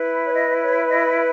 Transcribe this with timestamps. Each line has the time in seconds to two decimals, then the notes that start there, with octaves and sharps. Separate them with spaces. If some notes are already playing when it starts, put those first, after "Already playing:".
Already playing: E4 B4
0.26 C#5
0.33 D#5
0.61 C#5
0.89 D#5